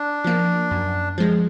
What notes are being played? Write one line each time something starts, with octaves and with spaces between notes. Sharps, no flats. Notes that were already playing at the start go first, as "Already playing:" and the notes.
Already playing: D4
F3 A#3
F#2
F3 G#3